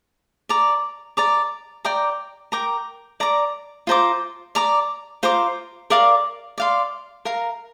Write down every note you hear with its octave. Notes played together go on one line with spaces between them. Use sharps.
D5 A#5 D6
D5 A#5 D6
D5 G5 A#5 D6
A#4 G5 A#5 D6
D5 A#5 D6
F4 C5 A#5 D6
D5 A#5 D6
F4 C5 A#5 D6
A#4 D5 F5 D6
D5 F5 C6
A#4 F5 A#5